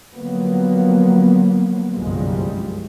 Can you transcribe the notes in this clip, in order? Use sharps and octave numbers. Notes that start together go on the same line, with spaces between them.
D3 F3 F#3 A#3 B3
G1 C2 F#2 F3 G3 G#3